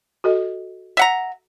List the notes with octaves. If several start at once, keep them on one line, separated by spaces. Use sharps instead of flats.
F#4 A4 D#5
E5 F#5 A#5